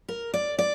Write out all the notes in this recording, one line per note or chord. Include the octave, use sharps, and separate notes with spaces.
A#4
D5
D5